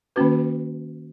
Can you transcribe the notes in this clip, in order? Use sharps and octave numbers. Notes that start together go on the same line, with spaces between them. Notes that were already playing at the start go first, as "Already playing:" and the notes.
D#3 A#3 C#4 F#4 B4